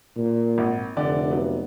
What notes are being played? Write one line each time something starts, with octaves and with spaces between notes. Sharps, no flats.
A#2
G#1
F1 D3 D5
F#3 B3